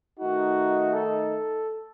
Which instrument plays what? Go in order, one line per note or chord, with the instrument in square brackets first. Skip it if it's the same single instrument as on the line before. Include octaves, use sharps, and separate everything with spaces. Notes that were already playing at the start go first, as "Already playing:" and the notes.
[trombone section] D#3 A3 D#4 [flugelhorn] F#4
[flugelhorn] A4